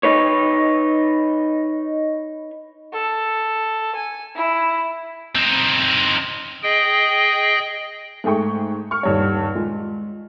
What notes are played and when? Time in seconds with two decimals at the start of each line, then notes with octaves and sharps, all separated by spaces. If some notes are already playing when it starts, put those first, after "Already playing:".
0.03 D#4 B4 C#5
2.93 A4
3.95 G#5
4.35 E4
5.35 C4 D#4
6.63 G#4 D#5 G5
8.24 G#2 A3 G#4 G5 C#6
8.91 C#6 F6
9.03 D#1 G2 C#5
9.55 G#3 F4